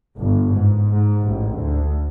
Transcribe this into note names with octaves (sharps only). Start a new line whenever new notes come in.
G1
G#2
G#2
A1
D2